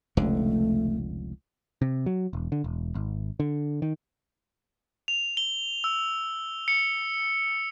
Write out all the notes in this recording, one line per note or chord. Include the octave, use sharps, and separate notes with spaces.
F1 C#2 D3 A3
C3
F#3
E1
D3
E1
G#1
D3
D#3
F7
G7
E6
C#7